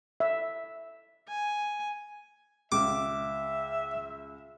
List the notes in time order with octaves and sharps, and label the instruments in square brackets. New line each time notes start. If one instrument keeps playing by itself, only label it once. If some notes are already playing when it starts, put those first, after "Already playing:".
[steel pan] E5
[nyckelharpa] G#5
[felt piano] C#2 [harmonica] E5 [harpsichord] D6